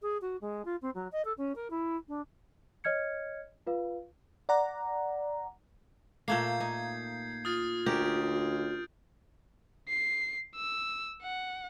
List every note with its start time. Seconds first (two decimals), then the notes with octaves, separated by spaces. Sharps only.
0.02 G#4
0.21 F#4
0.41 G#3
0.65 F4
0.82 C4
0.94 F#3
1.12 D#5
1.24 A4
1.37 C#4
1.55 A#4
1.70 E4
2.08 D4
2.84 C#5 D#5 F6 G#6 C#7
3.67 F4 B4 F5
4.49 D5 F#5 A#5
6.28 A#2 A3 A#3 G6 G#6 C7
6.60 D#4
7.45 F4 D#6 F6 A6
7.86 D2 C#4 G4 A#4 G6 D7
9.88 C7
10.56 E6
11.23 F#5